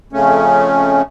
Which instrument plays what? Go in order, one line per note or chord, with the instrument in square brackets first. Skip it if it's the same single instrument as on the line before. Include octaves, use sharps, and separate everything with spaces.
[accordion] F2 C#3 A3 C#4